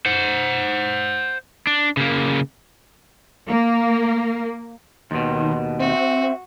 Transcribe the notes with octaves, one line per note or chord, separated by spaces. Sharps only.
C5 F#5
D4
C#3 A#3
A#3
D#2 B2 D#3 C6
C4 F#4 E5